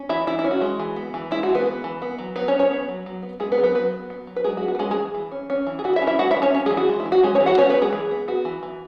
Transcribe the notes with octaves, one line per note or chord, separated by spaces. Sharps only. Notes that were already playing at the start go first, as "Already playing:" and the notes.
Already playing: C#4
E3 E4 E5
E3 E4
E4
C#4
F#4
G#3
E3
B3
E3
G#3 E4
F#4
E3
B3 B4
B3
E3
B3
F#3
F#3 B3 B4
C#4 C#5
B3
C#4 C#5
B3
F#3
F#3
B3
G#3 B3 G#4
B3 B4
F#3
B3 B4
F#3 B3 B4
B3
B3
F#3
B4
F#3 G#3 G#4
F#4
B3
F#4
B4
G#3 C#4 G#4
G#3 G#4
E3
E3
C#4
C#4
E3
G#4
E3 F#4
E4 E5
C#4
E4 E5
G#3 F#4 F#5
E4 E5
E3
C#4 C#5
C#4
E3 G#3 G#4
F#4
G#3
E4
E3
F#4
G#3 C#4 G#4
C#4 C#5
E3
F#4 F#5
B3 C#4 C#5
B3 B4
E3
G#3 G#4
E3
B3
B3 F#4
E3
E3